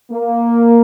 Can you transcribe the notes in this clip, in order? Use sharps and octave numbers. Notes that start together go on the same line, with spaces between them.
A#3